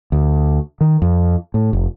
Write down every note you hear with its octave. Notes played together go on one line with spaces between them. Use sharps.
D2
D#3
F2
A2
F1